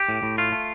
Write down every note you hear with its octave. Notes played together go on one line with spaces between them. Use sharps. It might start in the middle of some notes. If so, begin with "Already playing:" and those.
Already playing: G4
A2
A2
A3 F4
A3